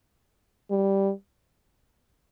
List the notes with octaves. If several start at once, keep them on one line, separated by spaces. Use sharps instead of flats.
G3